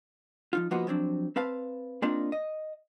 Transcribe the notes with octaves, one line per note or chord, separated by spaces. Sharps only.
F3 D#4 F4
F3 A#3 B3 D#4 F4 F#4
F3 F#3 C4 D4
C4 B4 F5 A5
A#3 C4 D4 D#4 F4 A#4
D#5